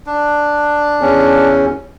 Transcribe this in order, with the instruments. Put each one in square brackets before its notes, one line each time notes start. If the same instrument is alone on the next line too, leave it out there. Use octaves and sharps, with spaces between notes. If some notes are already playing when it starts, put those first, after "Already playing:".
[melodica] D4
[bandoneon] E2 C#4